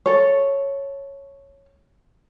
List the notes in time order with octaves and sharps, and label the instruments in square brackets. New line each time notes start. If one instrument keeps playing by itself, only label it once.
[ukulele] A4 C#5